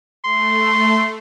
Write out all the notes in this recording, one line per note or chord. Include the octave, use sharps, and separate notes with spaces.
A3 C6